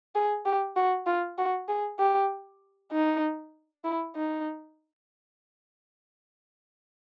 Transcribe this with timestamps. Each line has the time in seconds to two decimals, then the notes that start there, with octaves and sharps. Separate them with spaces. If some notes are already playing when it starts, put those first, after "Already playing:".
0.15 G#4
0.46 G4
0.76 F#4
1.06 F4
1.38 F#4
1.68 G#4
1.99 G4
2.92 D#4
3.84 E4
4.15 D#4